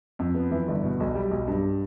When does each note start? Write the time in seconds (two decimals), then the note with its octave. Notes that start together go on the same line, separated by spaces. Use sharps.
0.19 F2
0.35 B3
0.51 E3
0.68 G1
0.83 B2
1.00 B1
1.15 G3
1.31 B1
1.47 G2